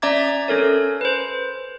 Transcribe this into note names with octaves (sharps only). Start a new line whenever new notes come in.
C#4 D5 E5 A#5 D6 G#6
C#4 A4 A#4 C#5
B4 C5